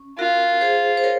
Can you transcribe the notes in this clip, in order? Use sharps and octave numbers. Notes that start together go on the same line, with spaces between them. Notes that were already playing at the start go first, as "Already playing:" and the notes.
Already playing: C#4
F4 F#4 A#4
G#4 C5
C5
A#4 C#5